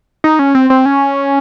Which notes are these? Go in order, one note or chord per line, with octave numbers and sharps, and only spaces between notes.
D#4
C#4
C4
C4
C#4